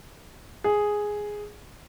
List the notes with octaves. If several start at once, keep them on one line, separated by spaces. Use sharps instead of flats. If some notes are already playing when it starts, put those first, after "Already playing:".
G#4